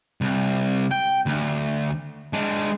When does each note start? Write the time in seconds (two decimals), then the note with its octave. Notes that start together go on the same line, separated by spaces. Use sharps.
0.21 C2
0.91 G5
1.26 D2
2.33 G#3 D4